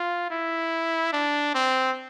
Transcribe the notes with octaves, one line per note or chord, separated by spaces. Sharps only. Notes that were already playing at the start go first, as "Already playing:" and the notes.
Already playing: F4
E4
D4
C4